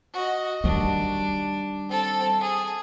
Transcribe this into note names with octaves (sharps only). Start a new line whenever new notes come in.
F#4 D#5
D#3 G3 D4
C4 A4
G#4